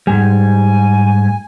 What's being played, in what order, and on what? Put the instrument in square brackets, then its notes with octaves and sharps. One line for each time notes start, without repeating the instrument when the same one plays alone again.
[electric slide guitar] G#2 G3 [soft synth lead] G#5